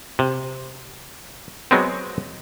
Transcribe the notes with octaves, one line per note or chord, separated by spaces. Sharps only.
C3
F#3 G#3 B3 C4